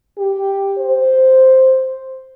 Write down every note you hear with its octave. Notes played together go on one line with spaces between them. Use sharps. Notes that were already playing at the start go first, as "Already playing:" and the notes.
G4
C5